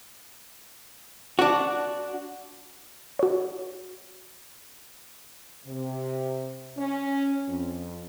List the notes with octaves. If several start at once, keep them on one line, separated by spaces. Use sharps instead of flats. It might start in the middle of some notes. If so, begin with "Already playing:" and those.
D4 F#4
F#4 C#5
C3
C#4
F2